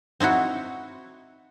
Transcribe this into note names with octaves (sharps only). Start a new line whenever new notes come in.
C4 D#4 E4 F#4